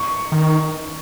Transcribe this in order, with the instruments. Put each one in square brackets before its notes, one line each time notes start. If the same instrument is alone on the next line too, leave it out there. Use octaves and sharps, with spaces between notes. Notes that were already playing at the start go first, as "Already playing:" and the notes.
Already playing: [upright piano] C#6
[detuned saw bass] D#3